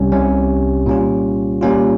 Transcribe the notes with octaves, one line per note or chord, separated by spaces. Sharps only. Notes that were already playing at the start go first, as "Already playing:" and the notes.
Already playing: C2 C3 G3 C#4
C2 C3 G3 C#4
A#2 G3 C#4 F4
A#2 G3 C#4 F4